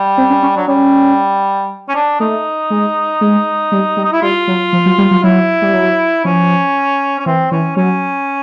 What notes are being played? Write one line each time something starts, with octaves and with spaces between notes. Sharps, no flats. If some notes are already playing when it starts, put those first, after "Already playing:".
Already playing: G3
C4
C#4
C#4
F#3 D4
G3 C#4
C#4
D4
A3 D#4
G#3
G#3
G3
G3
D#4
E4
G3 F4
F#3
F3
F#3
G3
F#3
F#3 E4
G3
F#3
F3 C#4
C#4
E3 C4
E3 C#4
F#3 C#4